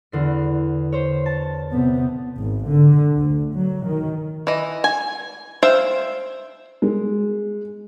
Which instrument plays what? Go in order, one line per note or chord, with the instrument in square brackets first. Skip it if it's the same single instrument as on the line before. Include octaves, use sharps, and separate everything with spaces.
[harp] E2 D3 C7
C5 C#5
A5
[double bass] C3 B3
[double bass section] G#1
D3
D2
F#3
D#3
[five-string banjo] E3 D#5
G#5
C5 E5 F5 G5
[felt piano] G#3